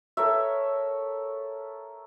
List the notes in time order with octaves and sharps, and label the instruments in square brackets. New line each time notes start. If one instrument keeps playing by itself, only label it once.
[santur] A4 A#4 C#5 E5